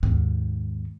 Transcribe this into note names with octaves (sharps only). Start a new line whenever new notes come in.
D#2 G#2